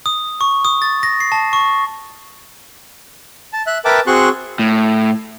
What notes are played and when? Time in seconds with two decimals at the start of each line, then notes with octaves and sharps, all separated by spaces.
0.06 D#6
0.41 C#6
0.65 D#6
0.82 A6
1.03 A#6
1.21 C7
1.32 A5
1.53 C#6
3.53 A5
3.67 E5 F#6
3.85 A#4 B4 E5 G5 A5 D6
4.07 C4 F#4 G#4 C6 C#6 F#6
4.59 A2